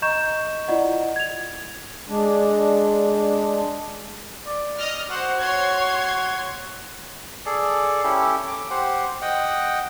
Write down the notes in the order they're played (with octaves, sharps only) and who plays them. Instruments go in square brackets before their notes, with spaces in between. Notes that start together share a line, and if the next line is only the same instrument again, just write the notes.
[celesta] D#5 A#5 C#6 G6 E7
E4 F4 D5 D#5 F#5
G#6 F7
[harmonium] G#3 D4
[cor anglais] D5
[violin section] D#5 D#6 F6
[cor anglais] F#4 [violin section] C5 F#5
[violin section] C#5 C6 G#6
[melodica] G#4 A4 D5
C#4 E4 G4 A4
D6
G4 C5 F#5
D#5 F#5 G5